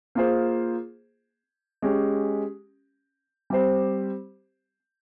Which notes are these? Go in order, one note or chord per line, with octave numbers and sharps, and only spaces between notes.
A#3 F4 G#4 C5
G#3 C#4 G4
G3 C4 G4 C5